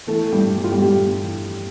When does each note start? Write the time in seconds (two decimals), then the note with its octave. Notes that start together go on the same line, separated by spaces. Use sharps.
0.07 E3 A3 A4
0.33 G3 G4
0.45 G2
0.58 G4
0.64 F4
0.72 G3 G4
0.82 G2 G3 G4
1.20 E3